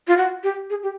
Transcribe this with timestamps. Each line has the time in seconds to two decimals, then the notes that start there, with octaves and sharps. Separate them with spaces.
0.08 F4
0.17 F#4
0.43 G4
0.70 G#4
0.83 G4